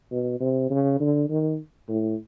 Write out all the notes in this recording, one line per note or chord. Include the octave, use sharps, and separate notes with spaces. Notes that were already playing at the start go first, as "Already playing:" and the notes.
B2
C3
C#3
D3
D#3
A2